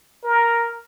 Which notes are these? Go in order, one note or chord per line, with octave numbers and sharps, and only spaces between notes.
A#4